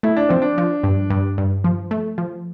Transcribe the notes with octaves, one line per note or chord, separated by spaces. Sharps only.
A3 E4
D4
F3 C4
D4
F3
G2
G2
G2
F3
A3
F3